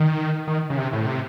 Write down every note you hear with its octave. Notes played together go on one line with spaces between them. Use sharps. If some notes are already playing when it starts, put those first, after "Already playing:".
Already playing: D#3
D#3
C#3
C3
A2
C3